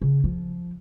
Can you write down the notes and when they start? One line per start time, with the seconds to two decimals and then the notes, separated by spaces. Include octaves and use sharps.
0.02 C#3
0.24 F3